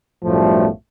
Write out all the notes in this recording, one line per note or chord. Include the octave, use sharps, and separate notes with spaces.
B1 F#2 A2 F3 G3 A3